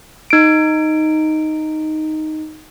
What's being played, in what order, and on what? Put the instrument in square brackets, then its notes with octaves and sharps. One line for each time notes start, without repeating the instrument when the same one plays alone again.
[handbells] D#4 D7